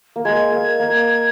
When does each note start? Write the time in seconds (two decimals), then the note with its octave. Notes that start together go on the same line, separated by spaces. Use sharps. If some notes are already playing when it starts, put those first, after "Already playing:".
0.16 A#3
0.25 G#3 G#6
0.52 A#3
0.79 A#3